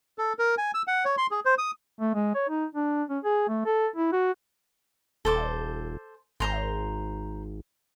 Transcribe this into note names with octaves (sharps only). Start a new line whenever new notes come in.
A4
A#4
G#5
E6
F#5
C#5
C6
G#4
C5
D#6
A3
G#3
C#5
D#4
D4
C#4
G#4
A3
A4
E4
F#4
D#1 A4 C5 D6
G#1 C5 A#5 C6